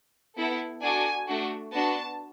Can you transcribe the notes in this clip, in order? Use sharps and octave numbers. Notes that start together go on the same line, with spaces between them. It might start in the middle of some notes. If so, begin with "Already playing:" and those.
B3 E4 A4
D4 F#4 A4 G#5
A3 D4 F#4
B3 D4 F#4 A5